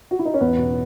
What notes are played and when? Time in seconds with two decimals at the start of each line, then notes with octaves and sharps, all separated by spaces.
0.11 F#4
0.19 E4
0.25 D#4
0.34 C#4
0.41 E2 B3
0.58 B2